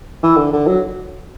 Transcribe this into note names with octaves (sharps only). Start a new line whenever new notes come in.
E3
D3
D3
F#3